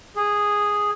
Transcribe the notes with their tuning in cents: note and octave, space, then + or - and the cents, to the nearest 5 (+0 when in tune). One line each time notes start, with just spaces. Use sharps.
G#4 -5